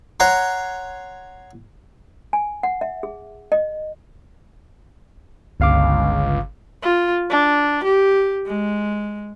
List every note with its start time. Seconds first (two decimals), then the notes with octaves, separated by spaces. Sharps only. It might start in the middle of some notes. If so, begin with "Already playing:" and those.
0.20 C#5 F#5 A#5 C6
2.33 G#5
2.63 F#5
2.81 E5
3.03 G#4
3.52 D#5
5.60 G1 C#2 F5 D6
6.83 F4
7.30 D4
7.84 G4
8.46 G#3